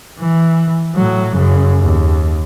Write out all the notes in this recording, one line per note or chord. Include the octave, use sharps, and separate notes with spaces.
E3
A2 F#3
F#2 C#3
D#2